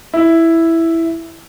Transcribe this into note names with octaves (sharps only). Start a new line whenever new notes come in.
E4